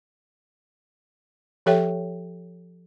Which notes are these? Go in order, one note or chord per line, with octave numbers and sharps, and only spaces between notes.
F3 G4 A4 C#5 E5 G5